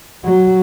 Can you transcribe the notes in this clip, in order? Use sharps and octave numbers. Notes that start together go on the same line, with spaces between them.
F#3